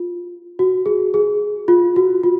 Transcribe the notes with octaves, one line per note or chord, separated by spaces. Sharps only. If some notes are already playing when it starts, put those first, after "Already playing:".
Already playing: F4
F#4
G#4
G#4
F4
F#4
F4